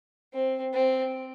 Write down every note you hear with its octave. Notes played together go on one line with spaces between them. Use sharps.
C4
C4